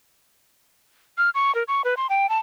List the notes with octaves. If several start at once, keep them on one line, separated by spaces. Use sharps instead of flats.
F6
C#6
A#4
C#6
B4
C6
G5
A5